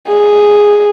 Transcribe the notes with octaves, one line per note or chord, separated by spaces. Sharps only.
G#4